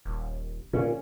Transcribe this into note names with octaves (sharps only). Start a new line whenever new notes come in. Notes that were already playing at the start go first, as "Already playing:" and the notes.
D#1
A#2 C#4